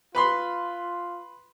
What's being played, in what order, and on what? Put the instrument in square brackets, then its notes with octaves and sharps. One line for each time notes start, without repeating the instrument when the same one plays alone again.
[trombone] F4 [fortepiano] B4 B5 C6